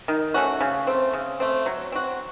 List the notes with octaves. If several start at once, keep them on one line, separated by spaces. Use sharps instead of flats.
D#3
A3 C#4 F#4
C#3
A3 C4
C#3
A3 C4
F#3
C4 F#4